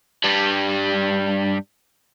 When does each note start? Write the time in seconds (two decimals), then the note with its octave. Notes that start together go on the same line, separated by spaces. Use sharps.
0.24 G2 G3